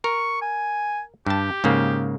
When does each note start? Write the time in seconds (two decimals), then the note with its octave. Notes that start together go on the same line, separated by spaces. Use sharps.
0.04 A#4 C#6
0.42 G#5
1.26 G2 G4 A5
1.64 G#2 C#3 A#3